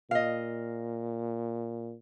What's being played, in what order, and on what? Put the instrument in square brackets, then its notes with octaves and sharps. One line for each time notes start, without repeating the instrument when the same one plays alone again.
[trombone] A#2 [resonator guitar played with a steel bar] D#5 F5